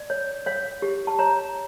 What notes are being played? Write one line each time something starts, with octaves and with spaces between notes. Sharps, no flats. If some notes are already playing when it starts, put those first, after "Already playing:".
Already playing: D5
C#5
C#5 F5
G4
A5
C#5 A#5